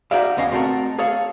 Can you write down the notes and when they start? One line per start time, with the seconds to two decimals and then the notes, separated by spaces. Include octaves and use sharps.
0.11 D#4 F#4 G#4 D5 E5 F5
0.37 D2 B3 C#4 D#5 F5 G#5
0.51 A3 C4 F#4 G4 A4 A#4
0.99 G#4 A4 C#5 F5